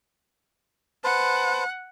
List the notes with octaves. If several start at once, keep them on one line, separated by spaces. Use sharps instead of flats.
B4 C5 F#5 A5